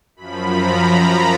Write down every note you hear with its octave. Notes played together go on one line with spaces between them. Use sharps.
F#2 F3 B5
A#5
A#5